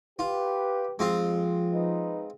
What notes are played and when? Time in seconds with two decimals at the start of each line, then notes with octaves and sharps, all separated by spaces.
0.19 F4 G4 B4
0.99 F2 F3 G#3 C4 F4
1.73 D#4 B4 D#5